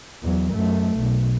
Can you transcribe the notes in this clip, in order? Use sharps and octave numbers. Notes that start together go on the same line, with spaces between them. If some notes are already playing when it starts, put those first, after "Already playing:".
E2 F#3
F#2 A3
B1